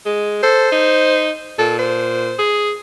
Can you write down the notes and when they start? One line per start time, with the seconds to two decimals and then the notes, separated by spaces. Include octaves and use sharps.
0.06 G#3
0.43 A4 C5
0.72 D#4
1.59 A#2 A4
1.79 C5
2.39 G#4